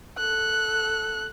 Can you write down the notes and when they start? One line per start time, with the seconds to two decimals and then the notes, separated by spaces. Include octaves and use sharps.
0.18 A4 F#6